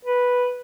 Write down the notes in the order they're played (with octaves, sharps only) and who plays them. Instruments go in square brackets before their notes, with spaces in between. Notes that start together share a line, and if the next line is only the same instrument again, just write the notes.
[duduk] B4